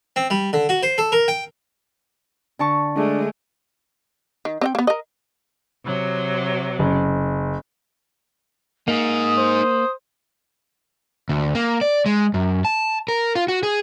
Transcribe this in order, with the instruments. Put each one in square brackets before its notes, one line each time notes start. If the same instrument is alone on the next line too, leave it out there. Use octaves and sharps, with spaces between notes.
[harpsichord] C4
G3
D3
F#4
C5
A4
A#4
G5
[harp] D3 A5 C#6
[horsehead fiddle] G#3 A3 [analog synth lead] D4
[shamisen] D#3
C4 D#5 G5
A#3 B3
A#4 D#5
[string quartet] C3 F#3
[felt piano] F#1
[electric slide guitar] A#3 [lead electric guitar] D#4 G#4 [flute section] D#6
[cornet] C5
[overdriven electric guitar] D2
A#3
D5
G#3
F#2
A5
A#4
F4
F#4
G#4